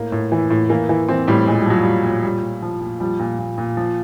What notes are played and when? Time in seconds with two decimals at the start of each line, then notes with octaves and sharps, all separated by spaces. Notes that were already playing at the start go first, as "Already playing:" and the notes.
Already playing: A2 A#3
0.12 A2
0.32 E3
0.50 A2
0.70 E3 A#3
0.89 E3
1.09 E3 C4
1.27 A2 G3
1.47 A#2 G#3
1.59 G3
1.66 F3 F#3
1.81 A#2 G3
2.04 A#2
2.23 A#2 G3
2.43 A#2
2.62 F3
2.81 A#2
3.00 F3 G3
3.20 A#2
3.39 A#2
3.58 A#2
3.77 F3